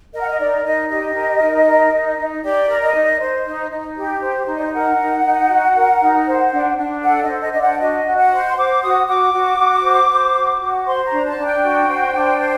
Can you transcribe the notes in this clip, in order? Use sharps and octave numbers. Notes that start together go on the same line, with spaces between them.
A#4 D#5
F#5
D#5
D#4 D5
D#4 D#5
G4 D#5
A#4
D#4
A#4
D#4
D#4
G4 D5
A#4
D#5
D#4
C5
D#4
D#4
G4
C5
D#4
D5
D#5
A#4 F#5
D#4
D#4
F#4
A#4
D#4
C5
D4
D4
A4 F#5
D#5
C5
D#5
D4 D#5
F#5
F#4 D#5
F#4
F#5
C5
C6
C5 D6
F#4 D#6
F#4 D6
F#4
F#4
C5
C5
F#4
F#4
C5 C6
A#5
D4
A5
D4
G5
F#4
C5
D4
C5